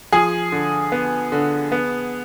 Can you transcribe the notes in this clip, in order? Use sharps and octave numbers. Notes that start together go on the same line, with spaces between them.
F3 G#4 G#5
D3
B3
D3
B3